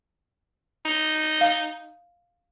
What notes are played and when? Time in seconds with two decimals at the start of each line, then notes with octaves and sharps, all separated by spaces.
0.85 D#4
1.41 F5